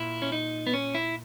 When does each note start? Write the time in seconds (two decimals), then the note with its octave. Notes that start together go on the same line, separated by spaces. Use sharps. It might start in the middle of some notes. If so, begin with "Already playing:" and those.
Already playing: A#2 E4
0.22 C#4
0.32 D#4
0.67 B3
0.73 C#4
0.95 E4